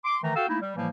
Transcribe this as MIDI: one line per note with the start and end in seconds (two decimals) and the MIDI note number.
0.05 0.17 84
0.05 0.17 86
0.23 0.32 51
0.23 0.32 52
0.23 0.32 57
0.23 0.32 82
0.36 0.46 66
0.36 0.46 69
0.36 0.46 77
0.36 0.46 79
0.36 0.46 88
0.48 0.57 57
0.48 0.57 58
0.48 0.57 63
0.48 0.57 64
0.61 0.76 55
0.76 0.88 45
0.76 0.88 52
0.76 0.88 53
0.76 0.88 55
0.76 0.88 58